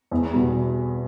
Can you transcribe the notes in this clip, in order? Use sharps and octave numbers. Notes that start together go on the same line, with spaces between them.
E2
B2 G3